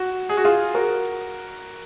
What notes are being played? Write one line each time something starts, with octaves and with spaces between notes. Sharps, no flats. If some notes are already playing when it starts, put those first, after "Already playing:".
Already playing: F#4
G#4
F#4
F4 G#4
F#4 A#4